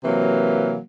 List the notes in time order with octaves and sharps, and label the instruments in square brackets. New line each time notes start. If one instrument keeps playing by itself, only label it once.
[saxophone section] C3 E3 F#3 A#3